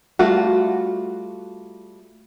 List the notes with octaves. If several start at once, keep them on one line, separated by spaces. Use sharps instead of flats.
G3 A3 F4 F#4